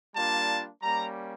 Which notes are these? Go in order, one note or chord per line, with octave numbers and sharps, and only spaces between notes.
G3 A#3 D4 F4 A5
G3 A#3 C#4 A#5